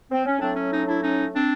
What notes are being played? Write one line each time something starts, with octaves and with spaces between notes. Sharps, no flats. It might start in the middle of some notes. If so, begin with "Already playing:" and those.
C4
C#4
A2 F#3 A3 C4 D4
C#4
C#4 D#4
D4 E4
C#4 D#4
C4 D4